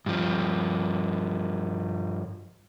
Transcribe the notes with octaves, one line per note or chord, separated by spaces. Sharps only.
G2 F3